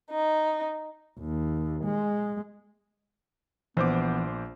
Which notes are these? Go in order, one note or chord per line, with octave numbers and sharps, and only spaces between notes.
D#4
D#2
G#3
A#1 E3 B3 C5 D6